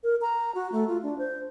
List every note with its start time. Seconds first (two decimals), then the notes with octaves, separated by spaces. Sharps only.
0.03 A#4
0.22 A#5
0.55 F#4
0.72 A3
0.88 F4
1.03 D4
1.18 C5